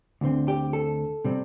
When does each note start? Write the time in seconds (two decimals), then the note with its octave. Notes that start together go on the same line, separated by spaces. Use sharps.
0.21 D2 D3 C4
0.48 G4
0.73 A4
1.25 C3 G3 C4